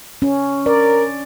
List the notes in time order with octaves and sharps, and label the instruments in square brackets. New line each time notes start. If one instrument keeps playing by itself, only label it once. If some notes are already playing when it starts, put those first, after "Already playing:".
[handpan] C#4
[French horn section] A#4 [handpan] D5